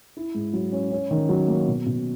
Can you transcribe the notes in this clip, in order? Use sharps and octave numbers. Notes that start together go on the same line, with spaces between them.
E4
G#2
F#3
C#4
C#4
D#3
F#3
A#3
B2
B2